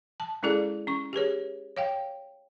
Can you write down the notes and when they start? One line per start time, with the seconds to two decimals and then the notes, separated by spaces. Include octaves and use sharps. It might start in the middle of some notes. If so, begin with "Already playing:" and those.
0.20 A5
0.43 G#3 C#4 E4 G#4 A4 D5
0.87 C#4 C#6
1.13 G4 G#4 B4 C#5
1.77 C#5 F5 G5